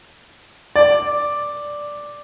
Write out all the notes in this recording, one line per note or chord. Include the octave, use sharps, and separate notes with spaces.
D5